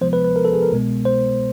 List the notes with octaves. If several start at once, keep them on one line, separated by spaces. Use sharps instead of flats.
D2 C3 F3 G#3 B3 C5
B4
B4
A#4
A4
G#4
A#4
C2 B2 G#3 B3
C5